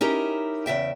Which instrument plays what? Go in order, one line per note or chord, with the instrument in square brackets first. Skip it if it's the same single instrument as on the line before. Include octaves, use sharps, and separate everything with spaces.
[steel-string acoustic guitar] C#4 D#4 E4 G4 A#4
E2 C#3 E5 G5